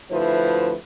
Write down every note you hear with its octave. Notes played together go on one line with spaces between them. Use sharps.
D2 F3 E4 B4 C5